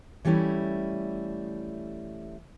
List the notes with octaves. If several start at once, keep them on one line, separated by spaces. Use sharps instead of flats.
E3 G3 A3 C#4 E4